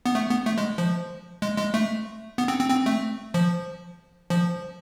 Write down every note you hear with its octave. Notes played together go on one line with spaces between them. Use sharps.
B3
A3
B3
A3
G#3
F3
G#3
G#3
A3
B3
C4
C4
C4
A3
F3
F3